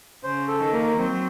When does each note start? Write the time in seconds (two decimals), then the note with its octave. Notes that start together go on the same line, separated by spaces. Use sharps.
0.24 C#3 C5
0.48 A4
0.60 D#3
0.72 A#3
0.97 F#3 C4